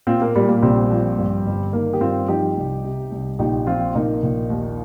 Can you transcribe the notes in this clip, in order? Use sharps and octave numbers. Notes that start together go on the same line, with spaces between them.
A#2 C4 F4
A#3
A#2 G3
A#3
A#1 G3 C4
F3
G2
G1
D#3 A#3
G4
G2 C4 F4
F3 D#4 G4
C2
C3
C2
A#1 D#4 G4
F3 C4 F4
A#1 A#3 D#4
A#1
D#2